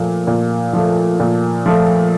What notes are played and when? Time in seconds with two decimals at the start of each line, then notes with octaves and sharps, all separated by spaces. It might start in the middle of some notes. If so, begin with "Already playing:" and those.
Already playing: A#2 F3 A3
0.27 A#2
0.73 F3 A3
1.20 A#2
1.66 F3 A3